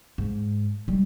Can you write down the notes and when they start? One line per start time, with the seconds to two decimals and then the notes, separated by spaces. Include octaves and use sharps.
0.18 G#2
0.88 G3 G#3